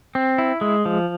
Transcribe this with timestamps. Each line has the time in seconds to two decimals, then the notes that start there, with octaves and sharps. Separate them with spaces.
0.15 C4
0.38 E4
0.61 G#3
0.85 F3